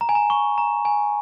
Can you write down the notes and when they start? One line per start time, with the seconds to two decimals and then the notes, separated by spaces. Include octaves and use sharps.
0.01 A#5
0.09 G#5
0.15 A#5
0.30 C#6
0.58 A#5
0.85 G#5